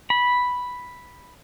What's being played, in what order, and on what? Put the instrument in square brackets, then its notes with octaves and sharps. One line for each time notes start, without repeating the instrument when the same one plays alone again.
[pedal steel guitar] B5